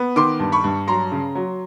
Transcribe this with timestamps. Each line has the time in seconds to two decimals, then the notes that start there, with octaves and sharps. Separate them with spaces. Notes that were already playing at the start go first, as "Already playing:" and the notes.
Already playing: B3
0.16 D#3 C6 D6
0.40 G2
0.52 B5 C#6
0.64 G2
0.88 F#3 A#5 C6
1.12 C#3
1.35 F#3